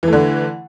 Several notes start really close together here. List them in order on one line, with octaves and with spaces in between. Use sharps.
E3 A3 D3